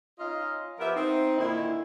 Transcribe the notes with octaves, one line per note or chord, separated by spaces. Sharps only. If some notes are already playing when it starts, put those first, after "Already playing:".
C#4 D#4 F4 D#5 F5
F3 B3 G4 A#4 E5
C4 D#4
A#2 D3 D#3 E4